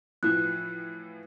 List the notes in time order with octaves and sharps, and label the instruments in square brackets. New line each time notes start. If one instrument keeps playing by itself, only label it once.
[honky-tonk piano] A2 E3 F3 [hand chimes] F#6